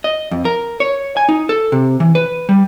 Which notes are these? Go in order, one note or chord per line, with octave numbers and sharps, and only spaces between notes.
D#5
F2
A#4
C#5
G#5
D#4
A4
C3
E3
B4
G3